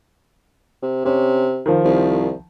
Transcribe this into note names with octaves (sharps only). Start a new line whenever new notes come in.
C3
C3 C#4
D#3 F3
C2